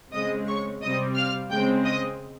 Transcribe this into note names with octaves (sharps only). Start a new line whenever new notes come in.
C#3 G#3 C4 D#5 D#6
C#5 C#6
C3 G3 C4 D#5 D#6
F5 F6
C#3 G#3 C4 G5 G6
D#5 D#6